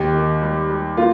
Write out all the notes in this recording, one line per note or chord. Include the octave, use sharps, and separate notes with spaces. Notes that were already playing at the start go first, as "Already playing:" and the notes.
Already playing: D#2 G4
D#3
G3
G3
A#3 F4